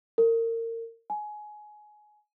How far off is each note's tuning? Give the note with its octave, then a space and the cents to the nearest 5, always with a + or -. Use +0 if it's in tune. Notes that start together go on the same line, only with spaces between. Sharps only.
A#4 -30
G#5 +20